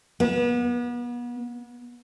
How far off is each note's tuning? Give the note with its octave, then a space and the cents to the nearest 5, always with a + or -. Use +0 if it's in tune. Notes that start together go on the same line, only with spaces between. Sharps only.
B3 -35